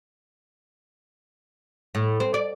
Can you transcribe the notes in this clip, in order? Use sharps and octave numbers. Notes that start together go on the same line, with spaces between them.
A2
C4
D5